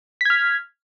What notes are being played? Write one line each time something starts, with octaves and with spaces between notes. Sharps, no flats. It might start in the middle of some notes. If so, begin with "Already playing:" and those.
F6 G#6 B6